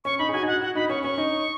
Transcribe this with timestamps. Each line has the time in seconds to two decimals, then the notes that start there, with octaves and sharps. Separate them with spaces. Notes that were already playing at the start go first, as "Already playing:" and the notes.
0.05 C#4 C#6
0.19 D#4 B5
0.29 G#4
0.33 F#4 G#5
0.43 D#4
0.47 F#4 F#5
0.61 F#4 F#5
0.75 D#4 B5
0.90 C#4 C#6
1.03 C#4 C#6
1.18 D#4